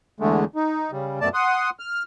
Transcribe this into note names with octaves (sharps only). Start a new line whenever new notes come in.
E2 D3 G#3 A3
D#4
C#3 G3
F#2 B2 A3 D5 A5
F#5 C6 D#6
F6